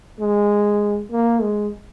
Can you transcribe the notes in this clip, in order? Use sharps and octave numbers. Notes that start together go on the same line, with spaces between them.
G#3
A#3
G#3